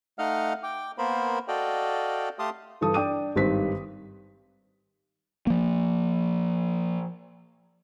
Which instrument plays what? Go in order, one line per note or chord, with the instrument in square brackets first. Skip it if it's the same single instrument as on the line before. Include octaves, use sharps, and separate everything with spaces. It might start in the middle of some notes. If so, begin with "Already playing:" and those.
[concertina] A3 D#4 D#5 F5 F#5 F6
G5 D6
A#3 B3 A#4 C5 B5
F#4 A4 D5 D#5 F5 G5
A3 G4 F5 A5 C6 D#6
[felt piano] G2 E3 G4 A4 A5 D#6
D4 G5 D6 D#7
G#1 G2 D#3 C5 B6
[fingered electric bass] F3 A#3